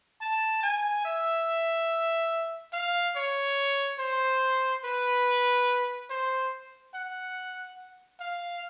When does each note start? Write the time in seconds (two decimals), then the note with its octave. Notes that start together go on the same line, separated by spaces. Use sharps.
0.21 A5
0.63 G#5
1.05 E5
2.73 F5
3.16 C#5
3.99 C5
4.84 B4
6.10 C5
6.94 F#5
8.20 F5